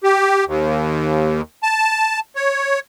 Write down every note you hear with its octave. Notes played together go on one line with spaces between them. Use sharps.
G4
D#2
A5
C#5